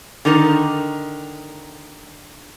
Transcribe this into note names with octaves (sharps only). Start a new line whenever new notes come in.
D3 D#3 D#4 A#4